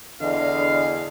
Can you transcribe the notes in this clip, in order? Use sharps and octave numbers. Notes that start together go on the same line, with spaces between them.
E2 D3 D#5 F5